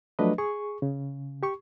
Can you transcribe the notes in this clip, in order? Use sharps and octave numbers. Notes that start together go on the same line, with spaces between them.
F3 F#3 A3 D4 B4 D#5
G#4 C#6
C#3
G4 C#6